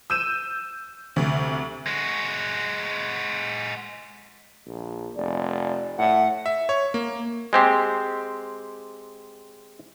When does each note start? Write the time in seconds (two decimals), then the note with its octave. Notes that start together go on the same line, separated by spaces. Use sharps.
0.10 E6 G6 D#7 E7
1.16 D2 C3
1.87 G#3 F#4
4.66 A#1
5.16 F1 D5
5.98 A2 E5 F#5
6.46 E5
6.69 C#5
6.94 A#3
7.53 G#3 C4 G4